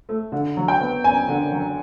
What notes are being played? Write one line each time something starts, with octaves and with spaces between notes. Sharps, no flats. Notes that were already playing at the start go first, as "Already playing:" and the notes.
A3
D3
F#3
G5
B3
F#2 G#5
D3
F#3